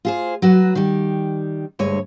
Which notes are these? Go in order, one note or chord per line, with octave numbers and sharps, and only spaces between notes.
F4 G#4 C5
F#3 F#4 B4
D#3 G3
D2 G2 G#3 C#5